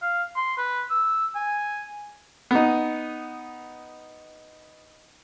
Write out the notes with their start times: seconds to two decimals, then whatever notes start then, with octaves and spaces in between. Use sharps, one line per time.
0.02 F5
0.37 C6
0.58 B4
0.90 E6
1.35 G#5
2.51 B3 D#4